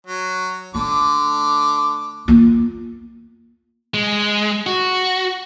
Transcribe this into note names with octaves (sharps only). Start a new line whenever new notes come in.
F#3
D3 A3 D6
A#3 F4
G#3
F#4